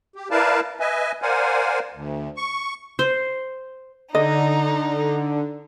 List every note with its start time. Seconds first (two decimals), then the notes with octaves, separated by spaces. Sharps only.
0.16 G4
0.31 E4 A#4 B4 D5 F5 A5
0.80 B4 D#5 E5 G#5
1.22 A#4 C5 D5 F5 F#5 G#5
1.93 D2
2.37 C#6
2.99 C5
4.15 D3 D#4 D#5